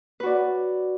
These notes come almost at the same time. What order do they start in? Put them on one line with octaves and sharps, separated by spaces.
B4 F#4 D5